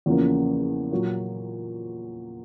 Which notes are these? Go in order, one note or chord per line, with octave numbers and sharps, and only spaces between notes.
E2 C#3 F3 A#3
A#2 F#3 A#3